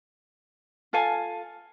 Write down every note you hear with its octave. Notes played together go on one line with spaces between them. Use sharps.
F4 A4 F5 G#5